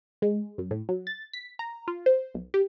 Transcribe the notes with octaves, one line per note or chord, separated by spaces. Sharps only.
G#3
F#2
A2
F#3
A6
B6
A#5
F4
C5
B1
G4